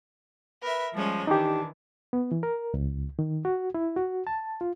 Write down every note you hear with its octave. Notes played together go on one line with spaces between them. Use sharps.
A#4 B4 E5
F3 G3 G#3 C#4
D#3 E3 D4 D#4 G4
B3
E3
A#4
C#2
D#3
F#4
E4
F#4
A5
F4